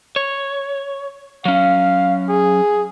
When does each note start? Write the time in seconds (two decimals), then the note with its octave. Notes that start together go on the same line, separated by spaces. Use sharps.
0.16 C#5
1.45 F#3 C#4 F5
2.29 G#4